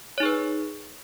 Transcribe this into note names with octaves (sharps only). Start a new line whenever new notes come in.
D#4 G#4 B4 C#5